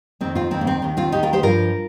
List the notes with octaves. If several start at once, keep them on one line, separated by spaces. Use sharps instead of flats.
F2 D#3 C4
C4 F4
F2 D#3 C4
A#3
C4
D#2 D#3
C4 F4
D#2 D#3 D#4 G4
F4 A#4
G4 C5
G2 F3 F4 A#4